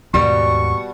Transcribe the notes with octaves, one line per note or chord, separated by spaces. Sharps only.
D#2 G#2 B2 G3 F#4 C#6